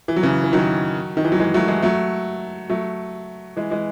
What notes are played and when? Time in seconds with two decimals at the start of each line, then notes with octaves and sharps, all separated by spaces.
0.08 E3
0.16 F#3
0.23 C#3 E3
0.44 E3
0.53 D#3 F#3
1.17 D#3
1.25 E3
1.32 F#3
1.40 E3 G#3
1.54 F#3 A3
1.68 E3 G#3
1.82 F#3 A3
2.70 F#3 A3
3.57 E3 G#3
3.71 E3 G#3